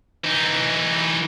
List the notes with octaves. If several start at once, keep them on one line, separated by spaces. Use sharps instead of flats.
E3 D#4